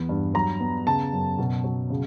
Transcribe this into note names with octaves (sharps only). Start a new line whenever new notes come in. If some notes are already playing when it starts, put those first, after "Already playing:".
Already playing: E2 B3
G2
F#3 A#5
B3
C#3 A5
F#2
B2
F#3
C#3